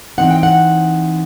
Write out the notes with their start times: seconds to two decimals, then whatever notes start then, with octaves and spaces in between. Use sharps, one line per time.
0.18 E3 G#3 C4 D#4 F#5
0.31 G5
0.43 F#5